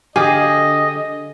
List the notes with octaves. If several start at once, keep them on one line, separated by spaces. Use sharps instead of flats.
D3 G4 G#4 D#5 F5 G#5